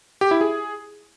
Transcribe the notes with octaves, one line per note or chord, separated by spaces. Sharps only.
G4
E4
G#4